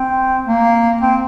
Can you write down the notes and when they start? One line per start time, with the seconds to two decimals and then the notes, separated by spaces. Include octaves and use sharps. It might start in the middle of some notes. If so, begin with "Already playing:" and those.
Already playing: C4
0.47 A#3
1.01 C4